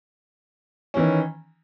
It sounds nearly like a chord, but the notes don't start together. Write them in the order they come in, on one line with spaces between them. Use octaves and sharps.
C#4 E3 D#3